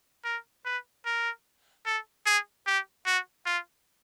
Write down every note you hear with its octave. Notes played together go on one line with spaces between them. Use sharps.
A#4
B4
A#4
A4
G#4
G4
F#4
F4